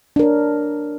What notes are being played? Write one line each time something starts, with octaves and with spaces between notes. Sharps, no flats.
D4 A#4 C#5